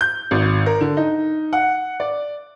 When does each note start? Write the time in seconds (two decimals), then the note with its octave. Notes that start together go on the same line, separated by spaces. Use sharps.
0.01 G6
0.31 G#1
0.66 A#4
0.81 D3
0.97 D#4
1.53 F#5
2.00 D5